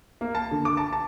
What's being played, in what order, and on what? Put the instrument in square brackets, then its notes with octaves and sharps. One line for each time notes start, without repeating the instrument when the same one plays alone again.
[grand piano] A#3
A5
D3
D6
A5
A5